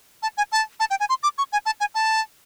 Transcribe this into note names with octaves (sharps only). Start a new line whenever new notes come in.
A5
G#5
A5
A5
G5
G#5
C6
D6
C#6
G#5
A5
G#5
A5